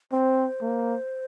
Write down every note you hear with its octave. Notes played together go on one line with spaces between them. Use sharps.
C4 C5
A#3